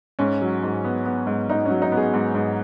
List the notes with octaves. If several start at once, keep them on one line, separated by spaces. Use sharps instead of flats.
G#2 C#4
F#3
G#2
B3
B3
G#2
G#2 D#4
C#4
F#3
D#4
B3
G#4
G#2
G#2